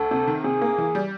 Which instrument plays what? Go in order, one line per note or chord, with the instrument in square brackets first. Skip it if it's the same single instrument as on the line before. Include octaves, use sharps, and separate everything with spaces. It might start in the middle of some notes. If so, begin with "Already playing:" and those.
Already playing: [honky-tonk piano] D2 [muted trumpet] A4
[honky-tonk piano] C3
D#3
[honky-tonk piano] C3 [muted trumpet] G#4
[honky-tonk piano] A#3
E3
G3